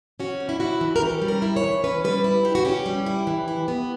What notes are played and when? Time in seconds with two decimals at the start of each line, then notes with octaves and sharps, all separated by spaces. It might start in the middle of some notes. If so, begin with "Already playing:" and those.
0.20 C#4 F#4
0.40 G3
0.49 E4
0.60 E4 F#4
0.81 E3
0.96 A#4
1.01 C#4 G4
1.22 G3
1.28 A#4
1.42 E4
1.56 C#5
1.64 E3
1.84 C#4 B4
2.04 G3 B4
2.24 E4
2.45 E3 G4
2.55 F#4
2.65 C#4 G4
2.86 G3
3.06 E4
3.27 E3
3.48 E4
3.68 B3